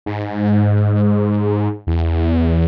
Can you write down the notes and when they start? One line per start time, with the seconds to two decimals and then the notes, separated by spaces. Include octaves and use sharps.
0.06 G#2
1.87 E2